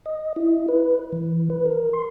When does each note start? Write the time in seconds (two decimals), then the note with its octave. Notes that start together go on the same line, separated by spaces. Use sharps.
0.06 D#5
0.36 E4
0.68 B4
1.12 E3
1.50 B4
1.66 A#4
1.93 C6